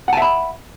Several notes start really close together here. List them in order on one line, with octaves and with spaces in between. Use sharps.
F#5 A5 E5 B5